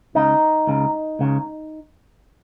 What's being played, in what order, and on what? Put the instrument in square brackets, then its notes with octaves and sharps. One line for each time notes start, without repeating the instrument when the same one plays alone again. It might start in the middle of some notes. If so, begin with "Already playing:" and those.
[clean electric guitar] C#2 C#3 D#4
C#2 C#3
C#2 C#3